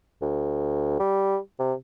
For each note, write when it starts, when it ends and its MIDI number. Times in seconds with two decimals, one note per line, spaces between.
0.22 0.98 38
1.00 1.38 55
1.59 1.74 48